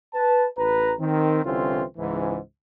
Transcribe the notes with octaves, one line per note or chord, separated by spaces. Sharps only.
B4 A5
A1 B4 A#5
D#3 C4
C2 D3 E3 C4 C#4 F4
C#2 G#2 E3